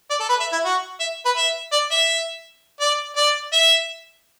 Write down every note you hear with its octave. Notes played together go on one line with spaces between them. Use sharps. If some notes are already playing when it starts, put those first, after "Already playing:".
D5
A4
B4
E5
E4
F#4
E5
B4
E5
D5
E5
D5
D5
E5